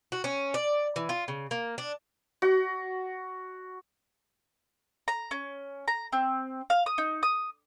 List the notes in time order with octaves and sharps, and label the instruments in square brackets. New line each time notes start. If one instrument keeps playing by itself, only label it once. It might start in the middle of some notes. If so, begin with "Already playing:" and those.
[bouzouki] F#4
C#4
D5
E3
F4
C#3
A#3
D4
[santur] F#4
[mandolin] A#5
C#4
A#5
C4
F5
D#6
D#4
D#6